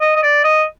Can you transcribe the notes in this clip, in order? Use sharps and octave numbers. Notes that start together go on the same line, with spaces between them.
D#5
D#5
D5
D#5